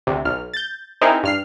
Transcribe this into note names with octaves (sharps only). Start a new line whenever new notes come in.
D2 C3
B1 F6
G6 A6
C4 D#4 E4 G#4 A#4
G2 F6 C7